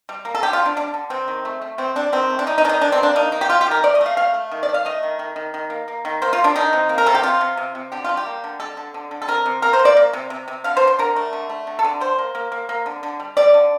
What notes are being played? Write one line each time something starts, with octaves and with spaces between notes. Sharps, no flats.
G3
A#3
A4
D3 G4
F4
D3
D4
G3 D4
D3
C3 C4
D#3
A3
A3
C3 C4
C3 D4
D#3 C4
A3
D4
G3 D#4
D#4
D#3 D4
D#4
D#3 D4
C4
A#3
D4
A#3 D#4
A#3 D#4
G4
G3 F4
G4
D#3 A#4
A3 D5
D#5
A3
F5
A3 F5
A3
D#3
D5
A3
F5
A3 D#5
D#3
D#3
D#3
D#3
A#3
A#3
D#3
A#3 C5
F4
A#3
D4
D#3 D#4
C3
A#3
A#4
C3 A4
G4
C3 F4
C3
C3
C3
D3 G4
G3 F4
G4
A#3
D3
G3 A4
D3
D3
D3
A4
C3 A#4
C3
A#3 A#4
C5
A#3
D5
A#3
C3
C3
C3
D3 F5
C5
D3
C5
D3 A#4
A3
D3
A3
D3
A4
D3
G3 C5
A#3
A#3
A#3
A#3
D3
D3
G3
G3 D5
D3